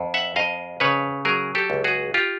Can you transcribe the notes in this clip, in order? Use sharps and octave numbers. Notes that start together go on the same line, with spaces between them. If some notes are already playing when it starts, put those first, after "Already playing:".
Already playing: F2
E5 F#5
F2 D#5 F5
C#3 B4 C#5
F#3 G#4 A#4
G4 A4
C#2
F#4 G#4
F4 G4